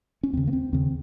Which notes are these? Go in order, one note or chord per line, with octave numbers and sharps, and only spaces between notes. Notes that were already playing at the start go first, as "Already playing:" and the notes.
C#4
D#2 C#3 C4
A#3
C4
D#2 C#3 C4